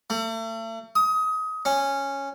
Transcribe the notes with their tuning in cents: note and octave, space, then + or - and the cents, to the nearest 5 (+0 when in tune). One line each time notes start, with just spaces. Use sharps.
A3 +40
D#6 +25
C#4 -5